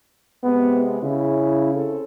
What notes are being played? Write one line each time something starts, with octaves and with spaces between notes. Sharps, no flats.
C3 G#3 B3
C#3 E4
C4 C#4 A4